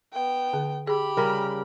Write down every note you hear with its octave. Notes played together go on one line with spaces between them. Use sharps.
B3 G5
D3
G4 G#4 B5
C#3 G3 A#4